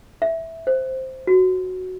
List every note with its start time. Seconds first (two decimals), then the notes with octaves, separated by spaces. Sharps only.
0.22 E5
0.67 C5
1.27 F#4